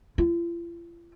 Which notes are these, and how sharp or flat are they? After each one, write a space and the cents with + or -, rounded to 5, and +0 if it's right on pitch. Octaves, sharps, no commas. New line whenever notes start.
F4 -45